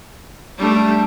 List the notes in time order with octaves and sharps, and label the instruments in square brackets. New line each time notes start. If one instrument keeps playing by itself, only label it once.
[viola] G3 A3 [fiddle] D4